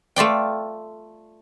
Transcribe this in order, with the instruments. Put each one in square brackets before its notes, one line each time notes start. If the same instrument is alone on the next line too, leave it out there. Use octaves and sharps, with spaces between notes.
[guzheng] A3 F4 D5 G5